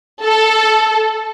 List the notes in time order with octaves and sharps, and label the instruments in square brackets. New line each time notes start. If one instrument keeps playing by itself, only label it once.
[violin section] A4